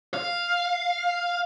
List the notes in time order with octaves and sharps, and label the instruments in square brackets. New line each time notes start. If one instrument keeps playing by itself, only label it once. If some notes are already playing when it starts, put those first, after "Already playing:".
[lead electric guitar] F5